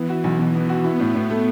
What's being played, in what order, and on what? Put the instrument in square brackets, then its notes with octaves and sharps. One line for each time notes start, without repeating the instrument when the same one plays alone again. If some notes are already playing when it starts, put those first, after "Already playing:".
Already playing: [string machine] E3 [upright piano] B3
[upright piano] F#4
B1
[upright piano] B2 [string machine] E3
[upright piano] B3
F#4
[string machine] B3 [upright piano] E4
[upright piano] A2
A2
A3